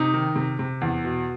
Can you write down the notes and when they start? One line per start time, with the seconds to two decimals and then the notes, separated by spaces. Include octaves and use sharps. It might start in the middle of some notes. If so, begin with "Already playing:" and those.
Already playing: C3 D#4
0.14 D#3
0.36 C3
0.59 C3
0.81 E2
1.04 B2